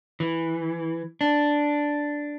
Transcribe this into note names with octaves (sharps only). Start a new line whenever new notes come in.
E3
D4